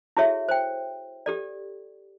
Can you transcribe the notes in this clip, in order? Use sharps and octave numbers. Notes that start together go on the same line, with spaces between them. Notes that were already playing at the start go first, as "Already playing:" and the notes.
E4 F#4 G#4 A4 C#5 E5
C5 G5
G4 A4 D5